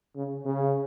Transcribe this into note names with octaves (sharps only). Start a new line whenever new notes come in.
C#3
C#3